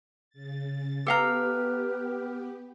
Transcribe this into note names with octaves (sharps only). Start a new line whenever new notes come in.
C#3 A6
B3 G4 A4 B4 F5 A#5 D6 F6